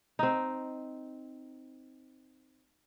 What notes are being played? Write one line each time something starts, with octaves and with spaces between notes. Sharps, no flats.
C4 D#4